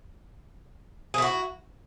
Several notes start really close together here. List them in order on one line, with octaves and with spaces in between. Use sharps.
G#4 E4 F#4